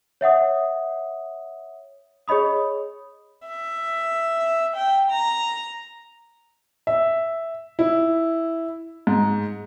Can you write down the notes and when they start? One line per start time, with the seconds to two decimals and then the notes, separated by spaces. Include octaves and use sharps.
0.21 C#5 E5 F#5 D#6
2.28 G#4 C#5 D#5 B5 D#6
3.47 E5
4.76 G5
5.10 A#5
6.87 E5
7.79 E4
9.07 G#2